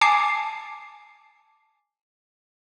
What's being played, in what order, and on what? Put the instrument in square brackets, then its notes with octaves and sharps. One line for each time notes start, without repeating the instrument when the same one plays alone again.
[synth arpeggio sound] G#5 A5 D6 C7